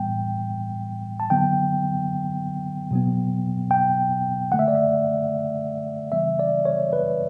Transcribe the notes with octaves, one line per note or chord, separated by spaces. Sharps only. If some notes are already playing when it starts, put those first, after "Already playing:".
Already playing: A2 E3 G3 B3 G5
A5
D3 F#3 B3 G5
B2 F#3 B3
G5
D3 A3 F#5
E5
D5
E5
C#3 E3 G3 B3 E5
D5
C#5
B4